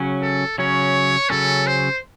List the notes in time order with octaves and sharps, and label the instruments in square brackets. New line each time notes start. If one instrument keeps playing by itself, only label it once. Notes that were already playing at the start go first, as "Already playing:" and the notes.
Already playing: [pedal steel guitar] C#3 F#3 C#4
[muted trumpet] A4
[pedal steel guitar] C#3 F#3 C#4 [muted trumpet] C#5
[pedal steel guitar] C#3 F#3 C#4 [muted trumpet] A4
[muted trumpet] C5